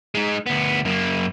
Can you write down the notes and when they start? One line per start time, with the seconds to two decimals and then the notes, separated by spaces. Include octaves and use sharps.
0.15 G#3 D#4
0.46 D2 B3
0.85 F#2 A#3